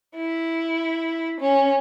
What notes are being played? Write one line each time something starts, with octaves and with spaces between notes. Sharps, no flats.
E4
C#4